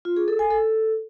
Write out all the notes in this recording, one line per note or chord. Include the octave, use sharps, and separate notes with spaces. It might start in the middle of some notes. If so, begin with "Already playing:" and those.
F4
G#4
A4
G#5
A4